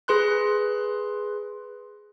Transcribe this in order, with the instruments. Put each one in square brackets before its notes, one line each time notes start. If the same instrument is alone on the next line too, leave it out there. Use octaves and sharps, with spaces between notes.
[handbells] G#4 B4 C6 F#6